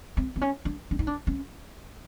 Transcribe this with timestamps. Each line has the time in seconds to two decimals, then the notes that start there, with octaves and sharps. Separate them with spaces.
0.17 C4
0.36 C4
0.42 C#4
0.65 D4
0.91 D4
0.99 D#4
1.07 D4
1.27 C#4